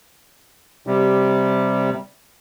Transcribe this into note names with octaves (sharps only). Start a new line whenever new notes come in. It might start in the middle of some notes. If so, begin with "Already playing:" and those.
C3 G3